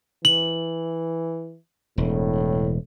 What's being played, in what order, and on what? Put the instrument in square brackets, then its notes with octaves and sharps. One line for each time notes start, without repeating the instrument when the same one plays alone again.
[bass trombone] E3 [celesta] F#7
[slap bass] E1 [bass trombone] A2